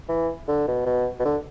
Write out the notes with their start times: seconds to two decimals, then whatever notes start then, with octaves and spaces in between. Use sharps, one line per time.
0.09 E3
0.48 D3
0.68 B2
0.86 B2
1.19 B2
1.25 D3